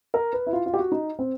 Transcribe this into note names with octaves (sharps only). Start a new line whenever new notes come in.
A#4
B4
E4
F4
F4
G4
F#4
D#4
C4